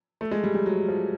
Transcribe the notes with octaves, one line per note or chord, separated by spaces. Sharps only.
A3
G#3
G3
G3
F#3
F3